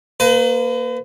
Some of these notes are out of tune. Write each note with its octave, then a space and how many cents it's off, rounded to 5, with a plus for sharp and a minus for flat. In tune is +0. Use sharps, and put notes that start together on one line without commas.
A#3 +0 B4 +40